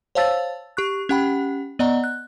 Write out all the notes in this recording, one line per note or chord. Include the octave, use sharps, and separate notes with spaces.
C5 C#5 F5 A5 E6 A6
G4 C#6 F#6
C#4 G4 F#5 G5 B5
B3 D5 D#5 F#5 A#5
F#6